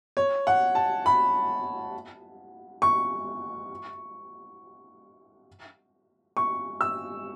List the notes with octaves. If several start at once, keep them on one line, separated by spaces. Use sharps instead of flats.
C#5
F#5
A5
B5
C#6
C#6
E6